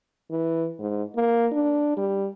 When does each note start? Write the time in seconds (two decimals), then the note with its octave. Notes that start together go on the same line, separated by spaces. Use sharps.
0.31 E3
0.79 G#2
1.16 A#3
1.52 D4
1.97 G3